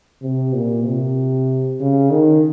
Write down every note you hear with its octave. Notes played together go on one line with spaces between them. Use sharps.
C3
A#2
C3
C#3
D#3